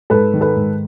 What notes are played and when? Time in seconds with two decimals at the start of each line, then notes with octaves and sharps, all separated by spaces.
0.10 G#2 A4 B4
0.34 D#3
0.41 A4 B4
0.56 G#2